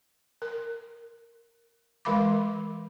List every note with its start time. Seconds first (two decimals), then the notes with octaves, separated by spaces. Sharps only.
0.42 A#4
2.05 E3 G#3 A#4 F5 B5 D6